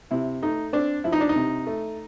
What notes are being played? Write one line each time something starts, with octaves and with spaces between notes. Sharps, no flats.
C3 E4
A3 D#4
C4 D4
F3 E4
D#4
D4
D#4
C3
A3